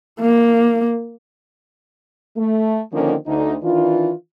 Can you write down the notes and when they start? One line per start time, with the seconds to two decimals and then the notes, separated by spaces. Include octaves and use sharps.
0.20 A#3
2.37 A3
2.92 D3 D#3 F3 A#3 C4 C#4
3.26 D2 D#4
3.63 D#3 E3 D4 F4